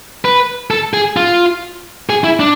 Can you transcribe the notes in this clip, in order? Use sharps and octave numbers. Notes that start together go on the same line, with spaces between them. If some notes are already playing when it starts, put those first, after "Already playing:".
B4
A4
G#4
F4
G#4
E4
D4